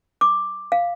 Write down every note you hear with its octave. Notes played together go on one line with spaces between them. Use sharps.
D6
F5